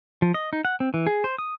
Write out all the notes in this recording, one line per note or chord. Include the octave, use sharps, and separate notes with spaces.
F3
D#5
D#4
F#5
C4
E3
G#4
C5
D#6